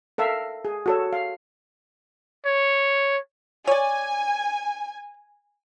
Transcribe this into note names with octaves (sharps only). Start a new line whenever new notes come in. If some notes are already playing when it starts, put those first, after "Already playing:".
A4 A#4 E5 F5
G#4
F#4 A4 C#5
F5
C#5
C#5 D5 G#5